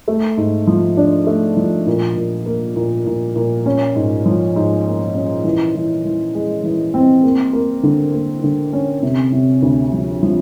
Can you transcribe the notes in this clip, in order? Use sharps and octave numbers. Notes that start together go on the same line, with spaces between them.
A3
G#2
F3
D4
A3
F3
A#2
A#2
A#3
A#2
A#2
A#2
C#4
G#2
F3
G#2
A#3
C#4
E3
E3
E3
G#3
E3
C4
A#3
A#3
D3
A#3
D3
C#4
C3
C3
D2
F3
F3